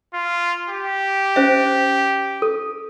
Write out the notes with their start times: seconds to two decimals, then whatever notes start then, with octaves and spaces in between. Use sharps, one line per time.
0.14 F4
0.70 G4
1.36 C#4 C5 E5
2.42 A4